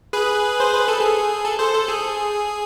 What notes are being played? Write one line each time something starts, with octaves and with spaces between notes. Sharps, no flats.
G#4 B4
C5
B4
A4
G#4
A4
A4 C5
A4
G#4